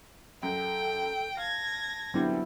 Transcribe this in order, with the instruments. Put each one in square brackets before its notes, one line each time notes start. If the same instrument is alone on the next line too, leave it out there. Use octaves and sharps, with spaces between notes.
[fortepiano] F#2 [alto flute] A4 [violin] G5
[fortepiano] F5 [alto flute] A5 [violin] G#6 A#6
[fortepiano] D3 G3 C4 [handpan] F#3 B3 E4